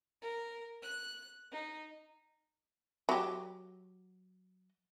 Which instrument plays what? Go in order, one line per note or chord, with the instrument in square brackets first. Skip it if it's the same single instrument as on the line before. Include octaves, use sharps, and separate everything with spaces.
[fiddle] A#4
F#6
D#4
[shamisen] F#3 G4